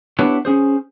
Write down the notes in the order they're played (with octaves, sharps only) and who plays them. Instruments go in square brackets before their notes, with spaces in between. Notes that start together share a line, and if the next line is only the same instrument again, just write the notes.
[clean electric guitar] B3 D4 E4 G4 B4 C#5
C#4 G#4 C5